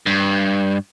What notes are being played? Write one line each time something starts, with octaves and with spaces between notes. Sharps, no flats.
G2